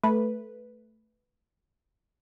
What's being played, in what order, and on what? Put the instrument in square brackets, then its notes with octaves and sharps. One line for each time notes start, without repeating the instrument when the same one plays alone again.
[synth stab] A3 B4